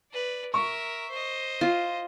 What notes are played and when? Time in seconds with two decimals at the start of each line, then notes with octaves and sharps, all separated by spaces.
0.12 B4 D5
0.54 A#4 E5 C#6
1.10 C5 D#5
1.61 F4